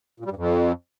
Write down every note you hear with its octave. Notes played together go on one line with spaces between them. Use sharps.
A#2
G3
G2
F2